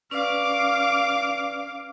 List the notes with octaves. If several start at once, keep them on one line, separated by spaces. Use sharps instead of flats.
C#4 B4 D5 F5 D6